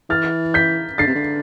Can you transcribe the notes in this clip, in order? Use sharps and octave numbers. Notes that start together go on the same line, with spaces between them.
E3 F6 A6
G6 B6
D3 A6 C7
C3
D3